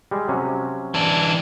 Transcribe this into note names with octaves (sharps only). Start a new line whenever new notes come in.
G3 G#3
C3 F#3 C#4
E3 D4